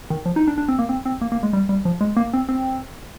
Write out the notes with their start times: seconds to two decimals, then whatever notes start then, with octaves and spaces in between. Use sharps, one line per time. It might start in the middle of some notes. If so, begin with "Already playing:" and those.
0.10 D#3
0.26 F3
0.36 D#4
0.48 D4
0.58 D4
0.68 C4
0.79 A#3
0.89 C4
1.06 C4
1.21 A#3
1.32 A#3
1.43 G#3
1.53 G3
1.69 G3
1.85 F3
2.01 G#3
2.17 A#3
2.34 C4
2.49 C4